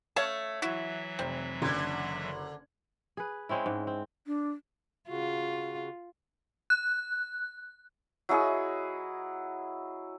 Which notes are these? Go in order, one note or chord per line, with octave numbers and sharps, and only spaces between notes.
A3 C#5 F5 A5
E3 F#3 E4 F#4 E5
F1 C4
F#1 D3 G#6
G#4 B4
G#3 C4 C#4 E4
G#2
C4
D4
C#3 F4 F#4
F#6
F#3 E4 G#4 D#5